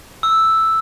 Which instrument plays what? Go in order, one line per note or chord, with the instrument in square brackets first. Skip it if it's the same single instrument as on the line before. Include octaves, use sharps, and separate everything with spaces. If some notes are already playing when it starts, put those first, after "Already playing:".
[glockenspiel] E6